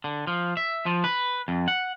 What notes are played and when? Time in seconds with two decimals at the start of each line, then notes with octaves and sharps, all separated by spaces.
0.04 D3
0.27 F3
0.57 E5
0.86 F3
1.04 B4
1.48 F2
1.68 F#5